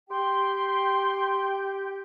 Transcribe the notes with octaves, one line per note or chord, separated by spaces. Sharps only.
G4 G5 C6